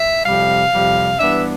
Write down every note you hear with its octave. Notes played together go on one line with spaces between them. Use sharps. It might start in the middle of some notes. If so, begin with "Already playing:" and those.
Already playing: E5
F2 C3 G3 F5
F2 C3 G3
G2 E3 B3 D4 E5